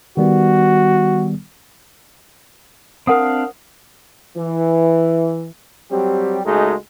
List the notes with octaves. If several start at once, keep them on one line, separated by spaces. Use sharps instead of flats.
D#3 G3 B3 F#4
C4 D4 A#4 F5 F#5 D#6
E3
F#3 G3 C4 G4
C#2 G#3 A3 D#4 F#4 G#4